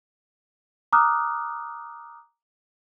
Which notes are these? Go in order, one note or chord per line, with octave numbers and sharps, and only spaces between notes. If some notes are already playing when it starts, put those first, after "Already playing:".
A#5 D6 D#6 F6 F#6